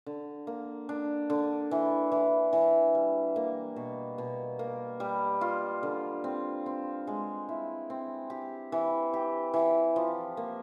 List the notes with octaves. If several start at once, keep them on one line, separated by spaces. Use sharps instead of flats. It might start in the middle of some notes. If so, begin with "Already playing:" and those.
D3
A#3
D4
D3
E3
E3
E3
G3
A#3
B2
B2
A#3
G3
F4
D3
C4
C4
G#3
E4
C4
G4
E3
G4
E3
F3
A#3